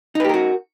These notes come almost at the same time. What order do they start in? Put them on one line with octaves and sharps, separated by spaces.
D#4 B4 G4 A#4 F#4